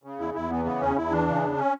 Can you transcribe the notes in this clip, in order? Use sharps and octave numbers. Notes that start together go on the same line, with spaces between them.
C#3
E2 E4
E2 E4
E3 B3
C#3 B3
E2 C#4
E2 E4
E3 D4
C#3
E2
C#4